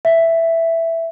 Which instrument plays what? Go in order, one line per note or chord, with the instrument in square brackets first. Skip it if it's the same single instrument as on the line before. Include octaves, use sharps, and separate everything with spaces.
[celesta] E5